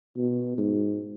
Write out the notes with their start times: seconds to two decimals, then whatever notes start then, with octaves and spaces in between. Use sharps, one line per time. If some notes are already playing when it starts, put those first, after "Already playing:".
0.17 B2
0.58 G#2